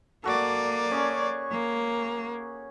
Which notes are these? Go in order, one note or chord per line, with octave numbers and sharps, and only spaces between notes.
A#3 F#4 A4 D5
C#4 G#4 C#6
A#3